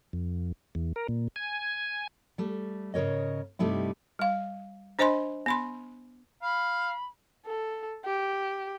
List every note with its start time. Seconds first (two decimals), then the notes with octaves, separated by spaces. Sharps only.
0.13 F2
0.75 E2
0.96 A#4
1.08 A#2
1.36 G#5
2.38 G3 A3
2.94 G#2 C#3 A#4 C#5 D#5
3.59 G2 C3 G3 A3 D#4 E4
4.19 G3 F5
4.99 D4 C5 D#5 G#5 B5 C6
5.46 B3 B5 C6
6.42 F5 B5
7.46 A4
8.05 G4